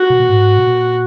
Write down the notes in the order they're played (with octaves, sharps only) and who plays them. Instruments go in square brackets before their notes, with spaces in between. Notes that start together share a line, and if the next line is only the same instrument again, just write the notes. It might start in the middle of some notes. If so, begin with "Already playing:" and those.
Already playing: [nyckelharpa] F#4
[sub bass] B2
A#2
G#2
B2
A#2